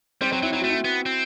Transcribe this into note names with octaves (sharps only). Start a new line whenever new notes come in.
G3 C4 C5
F#3 C4 C5
F#3 E4
F#3 E4
A3 F#4
E4
B3
C4